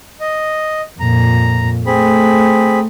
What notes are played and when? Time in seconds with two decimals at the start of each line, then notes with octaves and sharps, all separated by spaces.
0.20 D#5
1.00 F2 A#2 A#5
1.86 A3 C4 G#4 B5